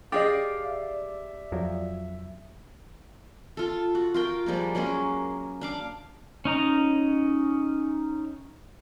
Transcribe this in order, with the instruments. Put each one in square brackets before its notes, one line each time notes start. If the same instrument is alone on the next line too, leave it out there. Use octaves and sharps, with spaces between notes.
[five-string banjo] G4 G#4 D#5 [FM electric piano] D5 [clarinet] F5
[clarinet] E5
[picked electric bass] F2 F3 F#3
[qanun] F4 A4
F#4
F4 A#4 G5
F3 G3 G#3 A#3
F#3 G#3 A#3 C#4
D4 F5 D6
[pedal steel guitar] C#4 D#4 A#5